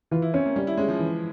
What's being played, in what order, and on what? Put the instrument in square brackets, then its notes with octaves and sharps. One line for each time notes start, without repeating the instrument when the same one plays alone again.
[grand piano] E3 [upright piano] F4
[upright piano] E4
[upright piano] C4 [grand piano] C#4
[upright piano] A#3
[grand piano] G3 [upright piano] C#4
[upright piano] E4
[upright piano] G#3 [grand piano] C#4
[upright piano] F3
[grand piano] E3